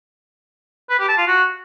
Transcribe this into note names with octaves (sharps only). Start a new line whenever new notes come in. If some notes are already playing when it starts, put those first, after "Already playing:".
B4
G4
A5
F4
F#4